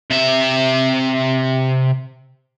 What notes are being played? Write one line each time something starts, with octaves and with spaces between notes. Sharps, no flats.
C3 E5